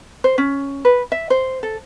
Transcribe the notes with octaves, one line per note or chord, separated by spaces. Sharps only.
C5
C#4
B4
E5
C5
A4